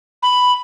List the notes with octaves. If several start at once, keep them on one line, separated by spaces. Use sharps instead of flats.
B5